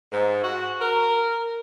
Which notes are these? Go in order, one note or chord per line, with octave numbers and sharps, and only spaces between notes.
G#2
F#4
A#4